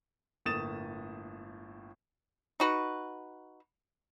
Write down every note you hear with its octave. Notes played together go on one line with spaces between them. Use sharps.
G1 A2 A#3 D#6 A6 E7
D#4 F#4 B4